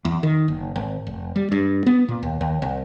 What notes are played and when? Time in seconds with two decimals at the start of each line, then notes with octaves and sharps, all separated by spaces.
0.05 E2
0.23 D#3
0.48 F#1
0.76 G#1
1.07 F1
1.36 G3
1.52 G2
1.86 B3
2.08 A#2
2.23 D#2
2.41 D#2
2.62 C2